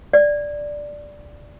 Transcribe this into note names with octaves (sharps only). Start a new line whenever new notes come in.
D5